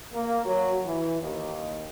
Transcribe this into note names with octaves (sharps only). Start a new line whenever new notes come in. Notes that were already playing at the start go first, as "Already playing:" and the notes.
A#3
F#3
E3
D#2